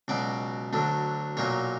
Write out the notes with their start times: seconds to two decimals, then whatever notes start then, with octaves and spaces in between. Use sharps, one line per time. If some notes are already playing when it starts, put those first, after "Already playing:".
0.08 C#2 B2 F#3 D5
0.73 D2 D3 F#3
1.37 B1 A#2 F#3 C#5